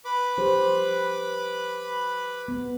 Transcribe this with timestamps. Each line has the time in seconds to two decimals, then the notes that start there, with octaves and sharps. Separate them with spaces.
0.05 B4 B5 D6
0.38 F3 G4 C5
2.48 B3